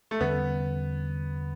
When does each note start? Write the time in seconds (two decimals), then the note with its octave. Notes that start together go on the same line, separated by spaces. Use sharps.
0.11 A3
0.21 E2 D3 G3 B3 C#4